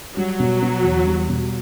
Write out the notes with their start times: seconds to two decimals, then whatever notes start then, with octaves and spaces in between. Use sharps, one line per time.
0.16 F#3 G3
0.40 B2
0.62 B3
0.84 E2
1.06 G3
1.29 B2